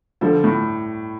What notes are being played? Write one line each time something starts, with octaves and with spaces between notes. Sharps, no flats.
D3 F3 G3
A2